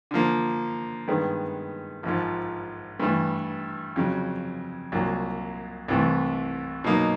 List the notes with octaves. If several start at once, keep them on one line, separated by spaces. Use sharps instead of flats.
D3 F3 A#3
G2 D#3 G#3 B3
A#1 G#2 F3
G2 E3 A3
F2 C#3 F#3
C2 A#2 F#3 A#3
C2 C3 E3 A3
B2 F#3 A#3 D#4